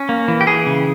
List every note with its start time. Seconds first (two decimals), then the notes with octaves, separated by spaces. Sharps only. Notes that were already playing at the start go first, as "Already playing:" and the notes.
Already playing: C#4
0.09 A#3
0.28 E3
0.41 G4
0.47 E3 G#4
0.67 C#3